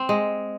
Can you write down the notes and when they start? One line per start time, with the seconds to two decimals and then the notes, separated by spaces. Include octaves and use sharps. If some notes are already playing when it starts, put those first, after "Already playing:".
Already playing: C4
0.09 G#3